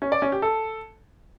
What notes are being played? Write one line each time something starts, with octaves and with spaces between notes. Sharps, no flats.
C#4
D5
C#4
G4
A4